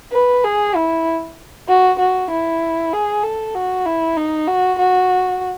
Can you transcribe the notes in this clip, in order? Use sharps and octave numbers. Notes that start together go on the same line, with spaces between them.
B4
G#4
E4
F#4
F#4
E4
G#4
A4
F#4
E4
D#4
F#4
F#4